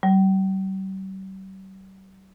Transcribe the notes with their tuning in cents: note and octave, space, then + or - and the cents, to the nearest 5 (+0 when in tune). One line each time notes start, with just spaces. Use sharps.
G3 -40